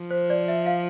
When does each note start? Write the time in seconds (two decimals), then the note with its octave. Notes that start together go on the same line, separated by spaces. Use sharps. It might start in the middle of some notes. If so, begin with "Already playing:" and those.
Already playing: F3
0.11 C5
0.30 D5
0.48 E5
0.66 F5